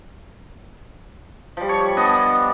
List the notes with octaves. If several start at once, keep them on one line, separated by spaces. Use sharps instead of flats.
F3 G3
C#5 C#6
B3 D4 D#5